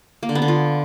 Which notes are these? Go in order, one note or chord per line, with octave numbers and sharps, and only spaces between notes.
A#3
D3
B3
D3
F4